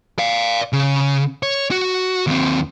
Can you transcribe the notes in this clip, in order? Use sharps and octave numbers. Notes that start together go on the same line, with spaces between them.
D5 F5
C#3
C#5
F#4
D#2 C4